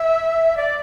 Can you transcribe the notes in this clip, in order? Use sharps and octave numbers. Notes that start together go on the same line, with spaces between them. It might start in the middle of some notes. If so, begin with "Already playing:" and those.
Already playing: E5
D5